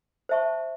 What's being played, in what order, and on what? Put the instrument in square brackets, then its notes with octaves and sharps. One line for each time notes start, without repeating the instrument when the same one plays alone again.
[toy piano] C5 E5 A5 C#6